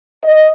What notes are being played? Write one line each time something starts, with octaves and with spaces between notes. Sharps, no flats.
D#5